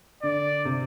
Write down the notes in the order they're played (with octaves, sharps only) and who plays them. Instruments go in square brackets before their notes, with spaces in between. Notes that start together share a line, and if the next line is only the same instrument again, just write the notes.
[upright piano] D3 [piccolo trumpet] D5
[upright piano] C3